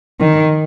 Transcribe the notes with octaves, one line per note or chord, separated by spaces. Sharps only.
D#3